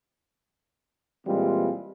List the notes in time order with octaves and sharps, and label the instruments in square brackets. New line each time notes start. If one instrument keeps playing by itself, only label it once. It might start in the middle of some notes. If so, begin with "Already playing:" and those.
[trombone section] A#2 E3 G3 G#3 C4 F4